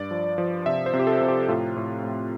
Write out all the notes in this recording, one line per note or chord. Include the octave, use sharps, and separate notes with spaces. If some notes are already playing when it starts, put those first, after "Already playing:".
Already playing: G2 D5
F3
F3
C3 E5
C5
C3
G4
A4
C3
G4
A2 F4
A2
A2